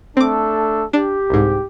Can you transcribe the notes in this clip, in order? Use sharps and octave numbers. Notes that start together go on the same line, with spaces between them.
A3 C4 D4 A4 D6
D4 G4
C2 G#2